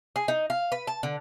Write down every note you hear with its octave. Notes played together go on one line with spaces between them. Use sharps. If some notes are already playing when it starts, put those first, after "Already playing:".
G#4
D#4
F5
B4
A5
D3